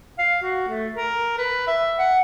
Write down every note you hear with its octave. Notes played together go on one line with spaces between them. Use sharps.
F5
F#4
A3
A#4
B4
E5
F#5